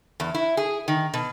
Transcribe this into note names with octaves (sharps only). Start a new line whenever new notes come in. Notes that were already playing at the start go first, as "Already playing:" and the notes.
E2
E4
G#4
D#3
B2